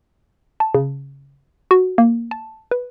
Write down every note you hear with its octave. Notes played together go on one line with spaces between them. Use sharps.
A5
C#3
F#4
A#3
A5
B4